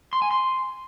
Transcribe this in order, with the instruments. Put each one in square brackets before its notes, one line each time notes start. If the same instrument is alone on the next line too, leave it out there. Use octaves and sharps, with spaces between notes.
[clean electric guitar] C6
G#5
C6